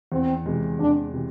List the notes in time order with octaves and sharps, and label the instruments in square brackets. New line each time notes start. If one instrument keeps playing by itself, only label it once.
[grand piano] E2 [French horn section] C4
[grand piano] C3 E3 G#3
[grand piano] E2 [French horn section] D4
[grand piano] C3 E3